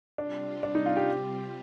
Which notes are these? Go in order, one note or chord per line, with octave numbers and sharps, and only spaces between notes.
C3 G3 C4 D4 F4
D4
D#4
F4
G4